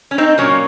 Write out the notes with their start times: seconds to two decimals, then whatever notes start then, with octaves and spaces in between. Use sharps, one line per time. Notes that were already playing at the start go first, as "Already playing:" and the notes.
0.11 C#4
0.18 C4 D#4
0.38 A#2 F#3 A#3 C#4